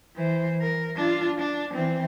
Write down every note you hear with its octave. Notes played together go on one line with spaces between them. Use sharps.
E3 C5
A#4
D4 F4
D4
E3 C4